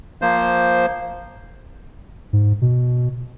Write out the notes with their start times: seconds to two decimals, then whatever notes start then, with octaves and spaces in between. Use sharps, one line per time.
0.22 F3 A#3 C5
2.33 G#2
2.61 B2